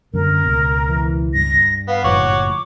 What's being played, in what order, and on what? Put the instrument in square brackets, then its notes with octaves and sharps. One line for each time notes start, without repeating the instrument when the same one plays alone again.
[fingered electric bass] F#2 D3 G3 [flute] A#4
[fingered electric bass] C#2 B2
[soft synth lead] E3
[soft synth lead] G2 [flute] A#6
[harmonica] B3 [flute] F5
[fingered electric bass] F#1 A2 F3 [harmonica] C#5 F#5 [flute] D6